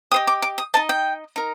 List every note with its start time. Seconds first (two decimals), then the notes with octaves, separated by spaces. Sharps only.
0.11 G4 C5 D#5 D#6
0.27 D6
0.42 D6
0.58 D#6
0.74 D#4 A#4 D#5 A5
0.89 G5
1.36 D#4 A#4